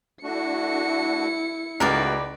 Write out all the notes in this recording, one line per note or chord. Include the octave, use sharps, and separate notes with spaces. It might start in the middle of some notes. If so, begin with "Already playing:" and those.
A3 D4 E4 F#4 C#7
C#2 A3 D#4 F#4 A#4 B4 D5